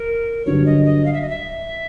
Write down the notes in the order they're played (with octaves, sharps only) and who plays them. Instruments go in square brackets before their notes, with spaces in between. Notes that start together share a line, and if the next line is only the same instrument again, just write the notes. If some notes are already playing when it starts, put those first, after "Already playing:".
Already playing: [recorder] A#4
[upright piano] G2 D3 F#3 [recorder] C#5
[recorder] D#5
D#5
F5
E5
D#5
E5